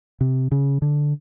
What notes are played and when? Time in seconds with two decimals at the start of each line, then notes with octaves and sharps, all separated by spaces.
0.21 C3
0.52 C#3
0.82 D3